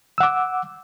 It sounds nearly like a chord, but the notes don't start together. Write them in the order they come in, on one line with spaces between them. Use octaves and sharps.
E6 F#5 D6